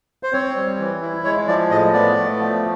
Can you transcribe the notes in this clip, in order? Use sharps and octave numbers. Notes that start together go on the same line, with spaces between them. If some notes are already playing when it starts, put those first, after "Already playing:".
C5
C4 C#5
G3
E3
E4
G#3 C#5
F3 D5
A2 D#5
B3 D5
A3
F3